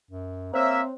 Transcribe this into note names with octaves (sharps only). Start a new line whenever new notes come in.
F#2
A#3 C4 C5 C#5 E5